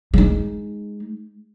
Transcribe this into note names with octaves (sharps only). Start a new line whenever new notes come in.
G#3 D#4